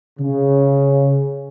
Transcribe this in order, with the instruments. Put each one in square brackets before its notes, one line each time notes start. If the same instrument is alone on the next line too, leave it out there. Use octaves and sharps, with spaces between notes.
[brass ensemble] C#3